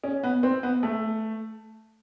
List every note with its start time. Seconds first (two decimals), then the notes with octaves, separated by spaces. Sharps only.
0.04 C#4
0.23 B3
0.43 C4
0.63 B3
0.83 A3